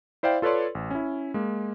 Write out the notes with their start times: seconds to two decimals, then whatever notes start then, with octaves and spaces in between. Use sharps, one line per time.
0.23 E4 C5 D5 F5 G5
0.42 F4 A4 B4 C#5 D5 C6
0.75 A1
0.91 C#4 E4
1.34 G#3 A#3